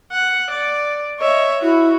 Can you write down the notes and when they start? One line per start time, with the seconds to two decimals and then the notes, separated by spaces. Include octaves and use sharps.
0.12 F#5
0.51 D5
1.20 C#5 D#5 E5
1.62 E4 F#4